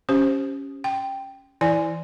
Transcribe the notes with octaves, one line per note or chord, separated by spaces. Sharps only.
C#4 G4 C5
G5
E3 E4 D5 G#5